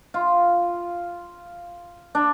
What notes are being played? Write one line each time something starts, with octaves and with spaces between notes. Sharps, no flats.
F4
D4